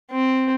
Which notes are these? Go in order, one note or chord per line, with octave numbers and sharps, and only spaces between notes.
C4